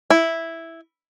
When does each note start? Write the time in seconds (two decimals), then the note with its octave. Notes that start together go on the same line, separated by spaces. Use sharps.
0.10 E4